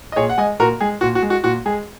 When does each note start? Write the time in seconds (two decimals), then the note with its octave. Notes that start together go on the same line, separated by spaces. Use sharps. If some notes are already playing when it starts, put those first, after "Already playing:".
0.12 D#5
0.16 A#2 G#4 C#5
0.29 F#5
0.38 G#3 D#5 G#5
0.60 A#2 F#4 A#4
0.81 G#3 G#4
1.01 A#2 F#4
1.15 F#4
1.22 G#3
1.30 F#4
1.44 A#2 F#4
1.66 G#3 G#4